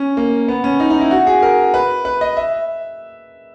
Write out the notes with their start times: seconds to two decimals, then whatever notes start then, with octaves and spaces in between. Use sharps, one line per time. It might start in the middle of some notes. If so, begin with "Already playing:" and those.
Already playing: C#4
0.17 A#3
0.48 B3
0.64 C#4
0.80 D#4
0.90 D#4
1.01 E4
1.11 F#4
1.27 G#4
1.42 A#4
1.74 B4
2.05 B4
2.21 D#5
2.37 E5